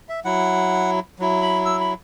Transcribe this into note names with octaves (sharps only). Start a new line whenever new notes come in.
E5
F#3 E4 F#5
F#3 E4
B5
E6
B5